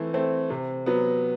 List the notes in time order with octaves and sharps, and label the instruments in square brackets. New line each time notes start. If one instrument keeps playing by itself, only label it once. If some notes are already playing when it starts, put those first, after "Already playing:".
Already playing: [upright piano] E3 A3 C4
A3 C4
C3
F#3 B3